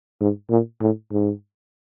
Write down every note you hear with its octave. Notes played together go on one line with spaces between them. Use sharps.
G#2
A#2
A2
G#2